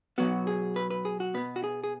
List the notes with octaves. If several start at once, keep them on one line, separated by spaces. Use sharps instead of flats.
B2 F#3 B3 F#4
G#4
B4
B4
G#4
F#4
B2 B3 B4
F#4
G#4
G#4